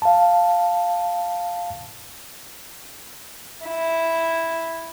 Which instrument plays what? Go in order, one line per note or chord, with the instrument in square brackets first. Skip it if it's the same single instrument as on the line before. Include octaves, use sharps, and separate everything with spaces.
[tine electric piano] F5 A5
[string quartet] E4